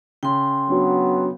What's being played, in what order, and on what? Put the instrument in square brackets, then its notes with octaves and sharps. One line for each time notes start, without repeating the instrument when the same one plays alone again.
[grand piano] C#3 [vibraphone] G5 C6
[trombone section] F#3 B3 [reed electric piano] D4 F#4